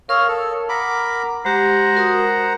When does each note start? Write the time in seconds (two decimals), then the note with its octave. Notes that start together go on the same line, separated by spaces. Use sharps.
0.09 A#4 C#5 F5 D#6 E6
0.28 A4
0.69 A#4 F#5 B5 D6
1.45 G#3 G4 C5 F#5 A#5
1.94 F#4 A#4 D#6